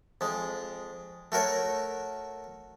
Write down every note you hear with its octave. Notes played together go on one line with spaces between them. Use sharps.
F2 G#3
A3 F#4 A#4 C#5